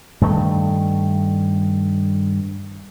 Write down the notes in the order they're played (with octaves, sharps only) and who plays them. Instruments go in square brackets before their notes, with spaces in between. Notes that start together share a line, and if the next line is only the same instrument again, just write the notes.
[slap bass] G2 D#3 A3